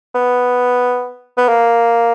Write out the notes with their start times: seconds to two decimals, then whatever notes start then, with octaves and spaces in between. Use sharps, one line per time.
0.15 B3
1.37 B3
1.49 A#3